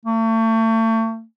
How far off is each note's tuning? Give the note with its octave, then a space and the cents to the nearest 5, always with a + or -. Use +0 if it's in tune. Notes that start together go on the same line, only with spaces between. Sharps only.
A3 +35